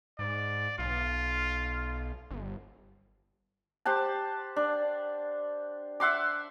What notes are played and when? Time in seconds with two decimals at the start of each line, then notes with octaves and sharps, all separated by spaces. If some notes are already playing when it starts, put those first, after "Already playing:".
0.19 G#2 D5
0.79 B1 F4
2.31 G1
3.86 G4 C5 F#5 A5
4.56 D4
6.00 E5 F#5 C6 D6